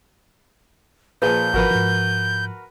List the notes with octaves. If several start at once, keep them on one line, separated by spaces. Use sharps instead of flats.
A#2 F3 G#4 B4 G6
G#1 F3 F#4 A#4 B4
G#2 F3